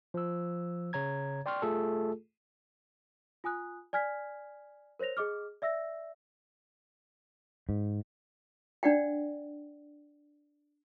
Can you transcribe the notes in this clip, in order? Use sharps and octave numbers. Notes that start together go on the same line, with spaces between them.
F3 E6
C#3 C#5 A#5 G#6
D5 G5 C6 C#6 F6
A3 F4 G#4 A4
F4 G#5 D#6 F#6
D5 G#5 F6 G#6 B6
A#4 C5 C#5 A#6 F7
G#4 D#5 D6 F6
D5 E5 E6 A#6
G#2
D4 D5 F#5 G5